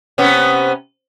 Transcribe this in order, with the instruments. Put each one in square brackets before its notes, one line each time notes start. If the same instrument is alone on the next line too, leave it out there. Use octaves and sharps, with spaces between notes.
[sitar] C3 B3 C#4